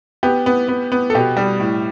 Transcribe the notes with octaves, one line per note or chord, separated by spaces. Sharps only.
B3 G4
B3
B3
B3
A4
B2 G4
G3
A2